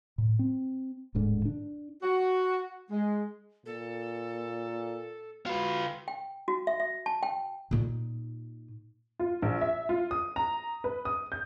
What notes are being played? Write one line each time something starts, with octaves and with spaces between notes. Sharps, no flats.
A2
C4
D1 D2 G#2 D3
D4
F#4
G#3
A#2 A4
F4 F#4 B4
G5
F#4
E5
E5
A5
G5
A#2 D#4
F4
A#1
E5
F4
D#6
A#5
B4
D#6
G6